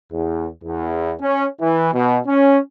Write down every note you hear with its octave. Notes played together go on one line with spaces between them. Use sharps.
E2
E2
C#4
E3
B2
C#4